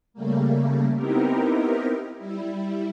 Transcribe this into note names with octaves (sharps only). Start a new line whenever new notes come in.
C#3 G3 A3 A#3
B3 C4 D#4 E4 G4 A#4
G3 E4